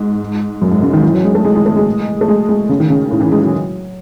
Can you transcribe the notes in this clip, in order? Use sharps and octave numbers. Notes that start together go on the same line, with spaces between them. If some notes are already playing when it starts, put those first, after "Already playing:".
Already playing: G#2
F#2
G#2
C#3
D#3
E3
F#3
G#3
A3
G#3
G#3
A3
G#3
A3
G#3
G#3
C#3
D#3
C#3
A2
E3
G#3
F#3